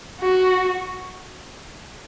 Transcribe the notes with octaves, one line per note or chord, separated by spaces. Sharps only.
F#4